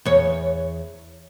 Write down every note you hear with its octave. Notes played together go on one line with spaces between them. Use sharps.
E2 C#5